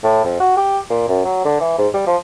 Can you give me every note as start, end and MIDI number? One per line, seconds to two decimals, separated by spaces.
0.04 0.24 45
0.25 0.40 41
0.40 0.52 66
0.57 0.79 67
0.90 1.05 46
1.09 1.22 42
1.25 1.41 54
1.45 1.57 50
1.61 1.74 52
1.78 1.88 44
1.94 2.06 55
2.07 2.16 53